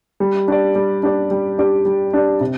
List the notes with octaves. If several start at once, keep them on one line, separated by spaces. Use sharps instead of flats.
G3
D4 G4 D5
G3
D4 G4 D5
G3
D4 G4 D5
G3
D4 G4 D5
C3